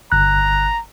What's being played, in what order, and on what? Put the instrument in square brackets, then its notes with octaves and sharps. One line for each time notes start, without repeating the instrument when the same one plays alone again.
[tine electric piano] G1 F#6 [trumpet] A#5